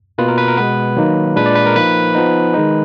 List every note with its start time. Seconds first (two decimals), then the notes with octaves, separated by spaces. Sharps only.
0.18 B2 A#3 F4 B4
0.28 A#4
0.38 B4
0.48 A#4
0.57 B2 G#3 B3 B4
0.97 D#3 F#3 A#3 D#4
1.36 A#2 G#3 D4 B4
1.46 D5
1.56 B4
1.66 A#4
1.76 F3 A#3 D#4 B4
2.15 F3 B3 D#4
2.54 D#3 G#3 D#4